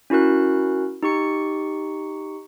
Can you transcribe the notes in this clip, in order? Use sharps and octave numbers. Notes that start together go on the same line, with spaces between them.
C#4 E4 F#4 A#4 F#6
D#4 G4 C#6 C#7